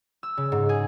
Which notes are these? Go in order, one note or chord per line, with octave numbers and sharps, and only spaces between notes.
E6
C#3
G#2
G#4